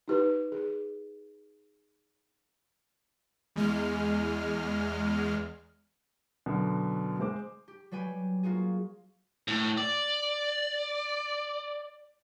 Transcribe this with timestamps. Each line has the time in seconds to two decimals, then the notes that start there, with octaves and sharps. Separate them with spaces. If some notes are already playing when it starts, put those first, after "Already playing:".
0.08 D#4 G4 B4
0.52 G#4
3.56 E2 G#3 F6
6.46 F#2 B2 D3
7.19 G#3 C5 D6
7.68 G4
7.91 F#3 G3 B4 G5 G#5
8.43 A#3 F4 F#4 G#4
9.48 A2
9.78 D5